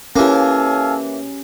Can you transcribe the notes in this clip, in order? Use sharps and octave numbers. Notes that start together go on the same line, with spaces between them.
E3 A#3 C#4 G4 A4 F5 G#5